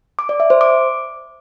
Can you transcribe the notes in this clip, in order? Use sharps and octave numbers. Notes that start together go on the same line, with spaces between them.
D6
D5
E5
C5
D6